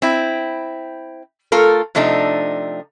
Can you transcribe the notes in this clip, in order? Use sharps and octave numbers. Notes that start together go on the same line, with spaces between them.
C4 E4
A3 F4 A4 A#4
C3 F3 A3 D4 D#4